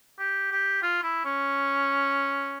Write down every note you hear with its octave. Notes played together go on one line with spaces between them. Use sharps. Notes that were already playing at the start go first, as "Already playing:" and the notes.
G4
G4
F4
E4
C#4